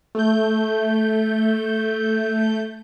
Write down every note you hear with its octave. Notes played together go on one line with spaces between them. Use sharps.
A3 G6